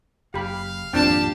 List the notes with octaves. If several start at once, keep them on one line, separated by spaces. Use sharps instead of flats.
F#1 G4 F5 B5
G#1 F2 A#2 C4 D4 G4 G5 A5